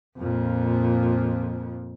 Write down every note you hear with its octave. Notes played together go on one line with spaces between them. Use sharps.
F2 A#2